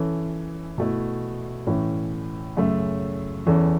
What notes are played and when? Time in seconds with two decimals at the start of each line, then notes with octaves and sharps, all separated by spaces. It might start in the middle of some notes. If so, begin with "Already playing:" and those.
Already playing: E3 C#4 A4
0.78 B2 A3 E4
1.67 A2 E3 C#4
2.57 F#2 C#3 A3
3.46 E2 E3 C#4 A4